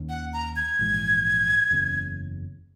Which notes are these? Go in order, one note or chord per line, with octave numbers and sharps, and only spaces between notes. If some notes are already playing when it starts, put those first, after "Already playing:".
Already playing: D#2 D#3 A#3 C#4
F#5
A#5
G#6
A#1 G#2 E3 G#3
F#1 E2 C#3